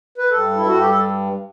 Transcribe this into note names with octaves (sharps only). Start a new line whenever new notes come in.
B4
G2 A4
E4
G2 F#4
G4
A4